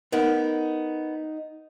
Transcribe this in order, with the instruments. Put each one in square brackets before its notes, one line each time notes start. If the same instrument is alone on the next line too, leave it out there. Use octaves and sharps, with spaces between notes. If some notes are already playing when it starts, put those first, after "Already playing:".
[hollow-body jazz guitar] B3 A#4 F#5 [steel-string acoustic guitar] D#4